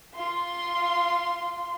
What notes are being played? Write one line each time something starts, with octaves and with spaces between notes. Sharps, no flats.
F4 C6